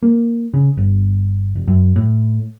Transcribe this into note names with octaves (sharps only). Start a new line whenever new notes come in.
A#3
C#3
G1
F1
F#2
A2